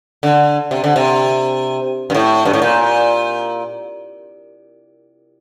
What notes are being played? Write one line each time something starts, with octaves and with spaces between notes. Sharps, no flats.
D3
C3
D3
C3
G2
A2
G2
A2
A#2